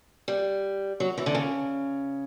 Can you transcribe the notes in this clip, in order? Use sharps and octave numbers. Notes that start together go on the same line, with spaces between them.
G3
F#3
E3
D3
C#3